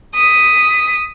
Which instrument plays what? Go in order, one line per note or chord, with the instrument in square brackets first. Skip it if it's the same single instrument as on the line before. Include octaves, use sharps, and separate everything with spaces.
[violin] D#6 B6